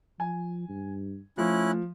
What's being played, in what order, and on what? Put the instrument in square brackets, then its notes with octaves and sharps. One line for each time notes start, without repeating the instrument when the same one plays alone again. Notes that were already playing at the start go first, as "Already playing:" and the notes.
[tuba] F3 [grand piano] G#5
[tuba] G2
[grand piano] F3 [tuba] A3 [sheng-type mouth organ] C#4 E4 F#6